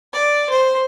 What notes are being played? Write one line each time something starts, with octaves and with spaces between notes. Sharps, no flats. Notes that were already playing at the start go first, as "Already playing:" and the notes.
D5
C5